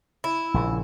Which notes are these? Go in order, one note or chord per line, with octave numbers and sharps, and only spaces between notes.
E4
A#1 C#3